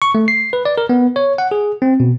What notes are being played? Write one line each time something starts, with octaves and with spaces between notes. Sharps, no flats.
C#6
A3
C7
B4
D5
A#4
B3
C#5
F#5
G#4
C4
B2